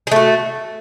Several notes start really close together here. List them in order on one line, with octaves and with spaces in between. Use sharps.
G#4 A3 F#4